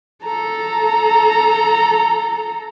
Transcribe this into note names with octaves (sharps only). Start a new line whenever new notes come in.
A4 A#5